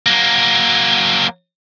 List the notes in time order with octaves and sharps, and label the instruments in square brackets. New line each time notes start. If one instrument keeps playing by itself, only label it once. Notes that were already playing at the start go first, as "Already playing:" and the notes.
[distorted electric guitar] F#3 A#3